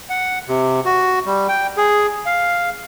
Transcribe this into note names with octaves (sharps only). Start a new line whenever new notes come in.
F#5
C3
F#4
G3
G5
G#4
F5